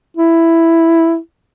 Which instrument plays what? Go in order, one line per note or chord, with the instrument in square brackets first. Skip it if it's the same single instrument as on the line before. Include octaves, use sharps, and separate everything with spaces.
[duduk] E4